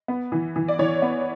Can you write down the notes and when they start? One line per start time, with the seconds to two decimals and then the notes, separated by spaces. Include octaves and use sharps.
0.08 B3
0.32 E3
0.56 E3
0.68 D5
0.79 E3 C#5
1.02 B3